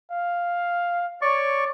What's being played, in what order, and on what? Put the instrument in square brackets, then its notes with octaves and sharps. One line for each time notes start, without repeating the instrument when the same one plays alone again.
[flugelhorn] F5
[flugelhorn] C#5 [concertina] D5 C#6